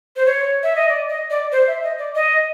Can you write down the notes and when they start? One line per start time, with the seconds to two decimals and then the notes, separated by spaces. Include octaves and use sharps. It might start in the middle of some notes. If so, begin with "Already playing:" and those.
0.16 C5
0.26 C#5
0.63 E5
0.76 D#5
0.89 D5
1.10 D#5
1.30 D5
1.52 C5
1.67 E5
1.83 D#5
1.98 D5
2.15 D#5